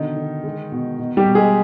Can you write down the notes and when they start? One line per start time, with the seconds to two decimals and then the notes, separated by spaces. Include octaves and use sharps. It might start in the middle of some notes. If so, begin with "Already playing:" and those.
Already playing: B2 D3 D#3 D#4
0.17 D3
0.44 G#3
0.72 B2
0.99 B2
1.17 G3 G4
1.26 B2
1.35 G#3 G#4